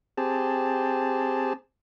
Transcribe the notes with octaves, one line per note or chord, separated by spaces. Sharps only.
C4 G4 G#4 A5